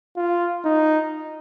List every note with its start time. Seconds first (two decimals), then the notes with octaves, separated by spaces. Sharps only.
0.17 F4
0.65 D#4